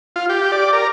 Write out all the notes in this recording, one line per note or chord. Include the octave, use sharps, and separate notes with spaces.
F4
G4
D5
A#4